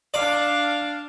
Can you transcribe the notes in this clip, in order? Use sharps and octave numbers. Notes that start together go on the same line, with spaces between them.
D4 D5 F5